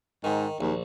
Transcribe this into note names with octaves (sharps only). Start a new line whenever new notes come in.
G#2 D#3
A#1 D#2